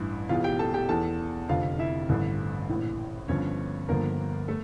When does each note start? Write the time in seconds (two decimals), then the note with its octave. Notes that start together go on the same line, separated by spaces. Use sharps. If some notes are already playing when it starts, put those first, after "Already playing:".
Already playing: A1 G2 E3 E4
0.29 E1 E2 E3 F4 F5
0.44 G4 G5
0.59 A4 A5
0.74 G4 G5
0.89 E2 E3 A4 A5
1.48 F1 F2 D3 F4 F5
1.79 E4 E5
2.09 A1 G2 D3
2.69 A#1 A2 E3
3.28 G1 G2 F3 C#4 C#5
3.88 G1 G2 D3 F3 A#3 A#4
4.48 A3 A4